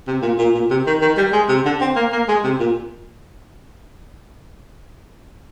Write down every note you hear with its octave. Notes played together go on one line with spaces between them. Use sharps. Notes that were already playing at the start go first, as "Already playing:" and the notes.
C3
A#2
A#2
A#2
C3
D#3
D#3
G3
G#3
C3
D3
C4
A#3
A#3
G#3
C3
A#2